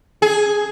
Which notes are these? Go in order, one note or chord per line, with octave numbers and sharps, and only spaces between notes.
G#4